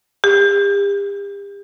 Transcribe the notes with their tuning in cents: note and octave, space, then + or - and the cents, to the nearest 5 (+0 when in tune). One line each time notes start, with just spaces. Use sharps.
G4 +40